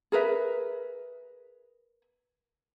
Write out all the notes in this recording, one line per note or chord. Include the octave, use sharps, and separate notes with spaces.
G#4 A#4 B4 E5